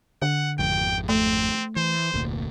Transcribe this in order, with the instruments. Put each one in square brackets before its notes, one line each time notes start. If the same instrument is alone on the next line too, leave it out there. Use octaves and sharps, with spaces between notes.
[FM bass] D3 [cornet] F#5
[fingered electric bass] G#1 F2 [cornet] G5
[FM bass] A3 [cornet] C4
[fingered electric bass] E3 [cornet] C5
[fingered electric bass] F1 D2 A#2